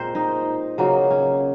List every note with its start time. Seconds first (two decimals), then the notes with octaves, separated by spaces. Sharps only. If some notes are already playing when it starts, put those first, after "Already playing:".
Already playing: A#2 G#3 C4 A#4 C5
0.15 D#4
0.78 C#3 F#3 A#3 C#4
1.10 C#4